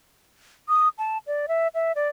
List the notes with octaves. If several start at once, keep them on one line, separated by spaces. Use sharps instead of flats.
D#6
A5
D5
E5
E5
D5